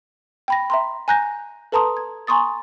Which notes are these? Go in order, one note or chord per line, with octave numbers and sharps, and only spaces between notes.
G5 B5 A#6
E5 A#5 C6
G#5 A#5 F#6 G6 A#6
A4 B4 A5 A#5 C6 D#6
G#6
G#5 A#5 C6 C#6 D#6 A6